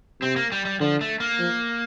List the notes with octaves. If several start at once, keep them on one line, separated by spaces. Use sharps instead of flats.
C3 C4
A#3
G3
G3
D3 F3
A3
A#3
F3